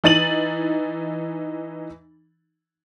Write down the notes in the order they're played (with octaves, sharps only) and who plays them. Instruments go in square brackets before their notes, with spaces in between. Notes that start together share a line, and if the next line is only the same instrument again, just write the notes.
[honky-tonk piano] E3 D#4 A6 D#7 F#7